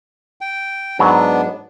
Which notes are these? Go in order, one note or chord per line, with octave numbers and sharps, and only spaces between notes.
G5
G#2 F#3 B3 D4 B4